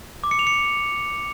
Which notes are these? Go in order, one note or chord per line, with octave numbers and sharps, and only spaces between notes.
D6
C#7
F7
C#7